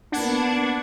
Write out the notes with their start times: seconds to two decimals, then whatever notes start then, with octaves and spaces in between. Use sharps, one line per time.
0.12 A#3 B3 D4 F#5 G#6